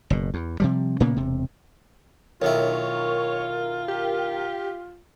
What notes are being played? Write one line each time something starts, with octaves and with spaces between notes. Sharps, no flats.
F#1 B2
E2
C3 F3 G3
A#2 C#3 A#3 B3
E1 C3
B1 D#3 E4 F4 A#4 C#5
G4